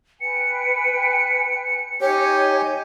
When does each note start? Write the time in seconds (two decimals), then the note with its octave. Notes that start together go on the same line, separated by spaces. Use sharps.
0.20 B4 G5 G#5 C#7
2.01 D#4 G4 C#5 D#5 G#5